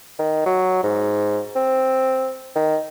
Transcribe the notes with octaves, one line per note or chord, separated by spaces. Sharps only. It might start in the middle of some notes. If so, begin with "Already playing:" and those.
D#3
F#3
G#2
C4
D#3